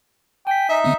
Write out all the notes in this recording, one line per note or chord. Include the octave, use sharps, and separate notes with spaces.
G5 G#5 B6
D#4 E5
D3 B3 C4